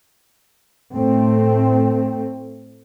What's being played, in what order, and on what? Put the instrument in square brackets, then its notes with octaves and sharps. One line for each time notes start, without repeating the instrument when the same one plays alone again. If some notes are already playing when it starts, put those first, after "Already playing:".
[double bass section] A2 A3 C4